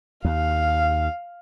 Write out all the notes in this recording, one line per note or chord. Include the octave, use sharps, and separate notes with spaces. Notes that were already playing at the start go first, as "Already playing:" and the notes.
D#2 F5